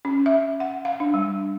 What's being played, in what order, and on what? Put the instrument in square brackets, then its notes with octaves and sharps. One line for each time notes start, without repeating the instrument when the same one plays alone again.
[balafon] C#4
E5
F#5
F5
D4
G3